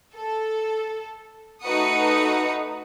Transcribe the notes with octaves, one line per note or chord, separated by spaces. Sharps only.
A4
A3 D#4 F#4 B4 D#6 C#7